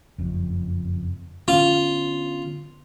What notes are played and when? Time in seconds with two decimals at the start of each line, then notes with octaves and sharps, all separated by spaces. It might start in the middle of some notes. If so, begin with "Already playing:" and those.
0.19 F#1 F2
1.48 D3 B3 C#4 F4